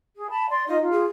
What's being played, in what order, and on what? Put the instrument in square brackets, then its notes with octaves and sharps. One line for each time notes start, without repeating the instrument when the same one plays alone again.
[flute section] G#4
A5 B5
D5 C6
[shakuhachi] D#4 [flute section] F4 D#5
[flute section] F4
[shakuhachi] G#4